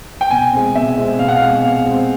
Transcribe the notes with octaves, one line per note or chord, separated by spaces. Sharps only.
G5
B2 G#5
G#3 C4
B2 E5
G#3 C4
B2 F5
F#5
F5
G#3 C4
B2 F5
G#3 C4